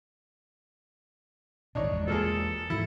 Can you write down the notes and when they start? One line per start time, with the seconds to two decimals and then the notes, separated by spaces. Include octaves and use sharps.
1.75 G#1 A#2 D4 D#4 C#5
1.92 E2 G3 G#3
2.08 F3 A#3 G#4 A4
2.70 G#2 E3 E4